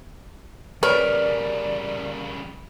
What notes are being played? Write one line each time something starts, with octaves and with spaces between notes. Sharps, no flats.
C#3 G3 A#4 B4 C#5 D5